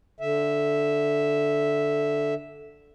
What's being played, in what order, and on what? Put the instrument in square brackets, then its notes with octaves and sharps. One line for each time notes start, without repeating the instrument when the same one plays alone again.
[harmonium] D3 E5